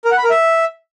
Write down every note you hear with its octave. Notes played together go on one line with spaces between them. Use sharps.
A#4
F#5
B5
A#4
E5